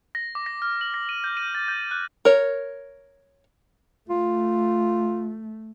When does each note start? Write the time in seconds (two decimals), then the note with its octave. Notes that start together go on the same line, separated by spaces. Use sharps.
0.15 A#6
0.35 D6
0.46 A#6
0.62 F6
0.81 F#7
0.94 A#6
1.09 D#7
1.24 G6
1.37 D#7
1.55 A6
1.68 G6
1.91 F#6
2.25 A#4 C#5
4.10 A3 F4